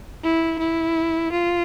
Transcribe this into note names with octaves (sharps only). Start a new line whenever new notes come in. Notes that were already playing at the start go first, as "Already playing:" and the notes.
E4
E4
F4